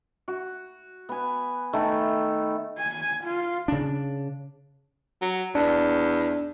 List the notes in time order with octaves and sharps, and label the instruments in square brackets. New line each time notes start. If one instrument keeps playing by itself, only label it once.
[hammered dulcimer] F#4
B3 G#5
D#3 A3
[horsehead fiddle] G#5
F4
[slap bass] C#3 D4
[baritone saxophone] F#3
[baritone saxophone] E2 [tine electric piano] D4